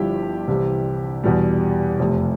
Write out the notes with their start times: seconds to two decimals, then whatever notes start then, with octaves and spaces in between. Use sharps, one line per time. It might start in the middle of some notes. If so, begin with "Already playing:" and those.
Already playing: G1 G2 F3 E4 G4
0.48 C2 C3 E3 G3
1.24 E2 B2 G3
1.99 F1 F2 C3